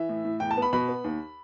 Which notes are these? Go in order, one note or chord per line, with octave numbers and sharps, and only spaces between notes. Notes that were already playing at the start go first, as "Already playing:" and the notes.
Already playing: E3 E5
A2
A2
E2 G5
A5
B3
B5
B2 B5
B3
D#2